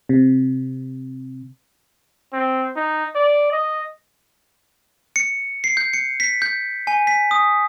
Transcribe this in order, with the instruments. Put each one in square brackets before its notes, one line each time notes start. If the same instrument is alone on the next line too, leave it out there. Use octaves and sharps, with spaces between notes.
[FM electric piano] C3
[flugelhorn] C4
D#4
D5
D#5
[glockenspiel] C#7
C7
G6
C#7
B6
G6
G#5
B6
D#6